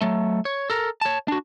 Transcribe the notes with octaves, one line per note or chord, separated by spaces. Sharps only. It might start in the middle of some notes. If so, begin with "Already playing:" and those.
F#3 A3
C#5
A4 A#4
C#5 A5
D4 F#4